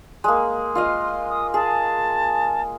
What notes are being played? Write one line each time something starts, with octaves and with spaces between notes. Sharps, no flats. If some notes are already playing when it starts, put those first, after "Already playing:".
G#3 A#3
F4 D#5 F5
D#6
G#4 A5